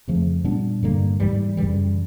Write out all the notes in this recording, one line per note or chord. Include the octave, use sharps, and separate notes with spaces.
F2 C#3 F3 A3
A#2 G3 B3 D4
G2 D3 G3 A#3
G#2 E3 G3
F#2 C#3 E3 G3